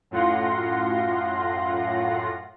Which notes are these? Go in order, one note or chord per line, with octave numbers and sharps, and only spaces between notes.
F#2 A2 F4 F#5 C6 A#6